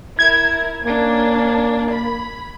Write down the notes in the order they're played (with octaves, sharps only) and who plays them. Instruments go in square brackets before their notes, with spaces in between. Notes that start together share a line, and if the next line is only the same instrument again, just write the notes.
[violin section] E4 A#4 [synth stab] G#6
[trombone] A#3 [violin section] C#4 D4
[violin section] B5